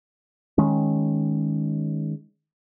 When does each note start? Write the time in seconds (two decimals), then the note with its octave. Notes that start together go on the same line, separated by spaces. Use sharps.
0.58 D#3 G#3 C#4